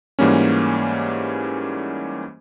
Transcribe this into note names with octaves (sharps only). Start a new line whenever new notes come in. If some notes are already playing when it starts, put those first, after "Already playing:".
G#2 E3 G3 A#3 C#4